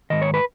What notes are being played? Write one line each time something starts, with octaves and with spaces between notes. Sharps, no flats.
G#2 D#3 D#5
C#5
B4